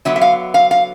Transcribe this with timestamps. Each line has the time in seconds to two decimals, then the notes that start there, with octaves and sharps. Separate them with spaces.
0.05 D3 F#3 B3 E5
0.16 E5
0.21 F5
0.54 F5
0.71 F5